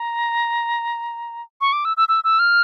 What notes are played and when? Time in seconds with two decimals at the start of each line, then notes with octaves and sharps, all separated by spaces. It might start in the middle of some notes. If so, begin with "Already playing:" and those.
Already playing: A#5
1.61 C#6
1.73 D6
1.85 E6
1.97 E6
2.09 E6
2.24 E6
2.39 F6